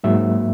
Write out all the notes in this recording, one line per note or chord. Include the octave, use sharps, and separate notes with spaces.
G#2 F#3 A#3 E5